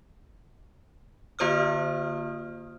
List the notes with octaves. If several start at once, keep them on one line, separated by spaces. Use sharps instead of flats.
D3 A#3 F4 C5 D#6 F6